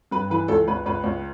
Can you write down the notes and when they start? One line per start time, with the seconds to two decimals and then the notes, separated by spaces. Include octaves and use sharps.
0.11 G2 B4
0.30 E3 B4
0.48 C#2 A4
0.68 C#2 B4
0.86 C#2 B4
1.04 C#2